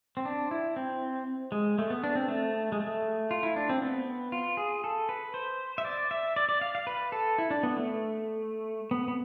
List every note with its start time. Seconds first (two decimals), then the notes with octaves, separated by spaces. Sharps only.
0.17 C4
0.25 D4
0.51 E4
0.76 C4
1.52 G#3
1.78 A3
1.90 B3
2.04 D4
2.15 C4
2.28 A3
2.72 G#3
2.80 A3
3.31 F4
3.43 E4
3.56 D4
3.69 C4
3.82 B3
4.32 F4
4.57 G#4
4.84 A4
5.09 B4
5.34 C5
5.78 E5
5.85 D5
6.11 E5
6.36 D5
6.49 D5
6.61 F5
6.75 F5
6.87 B4
7.12 A4
7.38 E4
7.51 D4
7.63 B3
7.77 A3
8.91 B3
9.08 B3